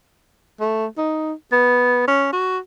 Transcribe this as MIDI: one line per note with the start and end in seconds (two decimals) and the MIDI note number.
0.61 0.86 57
0.98 1.33 63
1.53 2.03 59
2.08 2.31 61
2.33 2.59 66